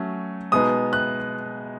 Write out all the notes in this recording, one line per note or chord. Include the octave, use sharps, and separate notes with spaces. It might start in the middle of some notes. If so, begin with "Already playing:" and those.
Already playing: F#3 A3 C#4
B2 G#3 B3 D#4 D#6
F#6